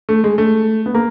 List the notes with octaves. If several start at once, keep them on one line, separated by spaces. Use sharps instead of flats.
A3
G#3
A3
B3
A#3